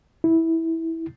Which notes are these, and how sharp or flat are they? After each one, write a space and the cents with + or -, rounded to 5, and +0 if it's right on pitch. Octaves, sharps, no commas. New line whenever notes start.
E4 -15